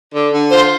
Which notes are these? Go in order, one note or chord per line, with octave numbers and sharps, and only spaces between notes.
D3
D3
F4 C5